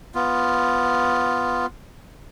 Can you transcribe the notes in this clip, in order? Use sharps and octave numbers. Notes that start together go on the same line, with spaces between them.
B3 F4